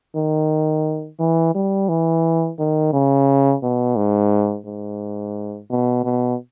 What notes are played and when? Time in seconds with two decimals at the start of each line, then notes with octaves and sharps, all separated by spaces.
0.16 D#3
1.20 E3
1.55 G3
1.89 E3
2.59 D#3
2.93 C#3
3.63 B2
3.96 G#2
4.66 G#2
5.70 B2
6.04 B2